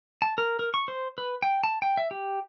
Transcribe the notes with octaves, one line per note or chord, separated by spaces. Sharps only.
A5
A#4
A#4
C#6
C5
B4
G5
A5
G5
E5
G4